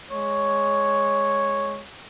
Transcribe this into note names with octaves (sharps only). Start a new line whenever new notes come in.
G#3 C#5